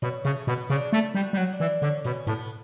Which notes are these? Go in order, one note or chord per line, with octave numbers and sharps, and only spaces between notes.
B2 F#3
C#3 A3
B2 B3
C#3 D4
A3 E4
G3
F#4
G3
F#3
D4
E3
D3 C#4
B2 C#4
A2 B3